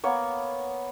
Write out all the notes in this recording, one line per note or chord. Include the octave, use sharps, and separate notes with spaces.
A#3 B3 C#5